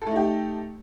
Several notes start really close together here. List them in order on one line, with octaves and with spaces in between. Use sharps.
A4 A3 D#4 G4